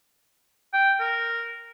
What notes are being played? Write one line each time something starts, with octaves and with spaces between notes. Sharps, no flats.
G5
A#4